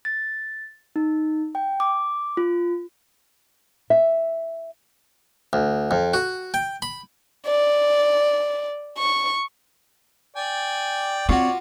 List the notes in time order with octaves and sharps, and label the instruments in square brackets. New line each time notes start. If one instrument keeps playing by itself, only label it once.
[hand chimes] A6
D#4
G5
D6
F4
[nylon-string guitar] E5
[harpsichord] D2
F2
F#4
G5
B5
[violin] D5
C#6
[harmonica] D5 G5 G#5
[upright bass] C4 [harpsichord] F4 F#4 [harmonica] C#5 D5